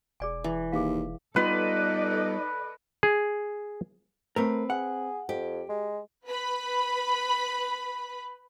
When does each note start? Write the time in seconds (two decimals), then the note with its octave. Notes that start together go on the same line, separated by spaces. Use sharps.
0.20 E1 G#4 D5 G#5
0.44 E3 E4
0.72 D#2 G#4 F5
1.36 G3 B3 D#4 F4 A4 B4 D5 D#5
3.03 G#4
4.36 A3 C4 A#4 B4
4.70 G#4 F#5
5.29 F2 G4
5.69 G#3
6.26 B4 B5